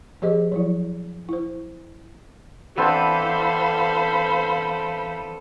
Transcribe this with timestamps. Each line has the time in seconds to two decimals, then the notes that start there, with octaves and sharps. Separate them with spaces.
0.22 F3 G4 G#4 C5 D#5
0.52 F3 F#3 E4
1.29 E4 C5
2.78 E3 B3 C4 D4 A4 C5 F5 B5